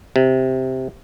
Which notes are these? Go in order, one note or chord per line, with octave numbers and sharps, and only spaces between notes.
C3